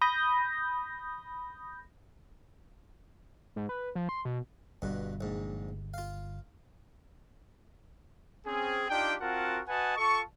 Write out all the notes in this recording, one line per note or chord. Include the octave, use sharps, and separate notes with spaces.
B5 D#6 G6 A#6
G#2
B4
F3
C6
B2
G1 G2 B2
A#1 G#2
F4 F5
C4 C#4 G#4
D4 D#4 F4 G4 G5
C4 F4 F#4 A#4 F#5 A5
F#4 B4 D#5 F#5 G#5 A5
F4 A4 A5 C#6